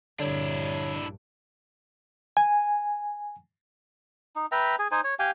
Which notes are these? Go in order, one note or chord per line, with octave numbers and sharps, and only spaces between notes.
A#1 G2 D3 D4 E4 C#5
G#5
D#4
B4 E5 G5 A#5
G#4 G#5
D#4 C5 G#5
C#5
G4 F5 G5 G#5